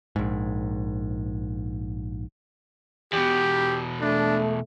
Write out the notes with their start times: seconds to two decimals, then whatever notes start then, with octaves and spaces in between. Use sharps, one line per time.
0.16 A#1 G#2
3.13 E2 B2 G4
4.01 A3 D4